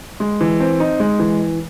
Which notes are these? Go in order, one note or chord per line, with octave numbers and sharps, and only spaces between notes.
G#3
E3
C4
D#4
G#3
E3